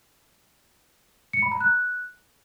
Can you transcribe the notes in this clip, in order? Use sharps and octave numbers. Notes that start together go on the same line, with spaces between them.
C#7
B5
A#5
F#6